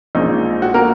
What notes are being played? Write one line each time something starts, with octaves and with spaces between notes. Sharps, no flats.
A#1 A#2 G#3 D#4
F#4
A#3 A#4